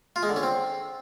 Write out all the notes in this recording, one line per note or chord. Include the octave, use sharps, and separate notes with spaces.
F4
G#3
D3
C#4
C4